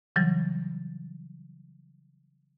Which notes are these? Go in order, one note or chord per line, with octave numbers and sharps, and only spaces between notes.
C#3 E3 F#3 G3